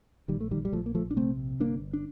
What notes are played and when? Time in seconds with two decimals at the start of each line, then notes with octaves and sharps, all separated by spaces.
0.28 A#1 D#3 G3
0.41 A3
0.51 D#3 G3
0.65 G3
0.72 A#1 F3 A3
0.86 A#3
0.95 F3 A3
1.11 D4
1.16 C3 A3 C4
1.60 G1 A#3 D4
1.93 D4